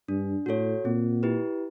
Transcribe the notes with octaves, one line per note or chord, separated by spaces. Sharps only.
G2 D4
A2 F#4 A4 C#5
A#2 C4
E4 G4 B4